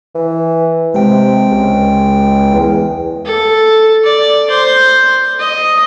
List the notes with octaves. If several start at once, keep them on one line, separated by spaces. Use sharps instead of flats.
E3
C3 G#3 G5
C#2
E2
A4
D5
C5
D#5